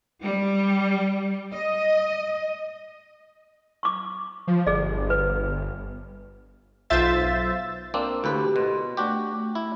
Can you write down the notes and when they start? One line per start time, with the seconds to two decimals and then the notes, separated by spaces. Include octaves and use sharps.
0.22 G3
1.52 D#5
3.83 C#6 D6
4.47 F3
4.67 G1 G#4 D5
5.10 B4
6.90 B1 F4 C5 E5 A6
7.94 A#3 C4 D4 E6
8.24 D2 A2 F#4 G4 B4
8.56 B2 C6
8.97 A3 D4 F#4 G4
9.55 E4